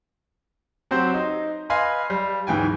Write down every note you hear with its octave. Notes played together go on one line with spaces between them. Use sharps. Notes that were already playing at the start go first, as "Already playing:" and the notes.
F#3 C4 G4 C5 F#5
D#4
B4 D#5 F5 G#5 B5 C6
G3
D1 G#2 E3 G5 G#5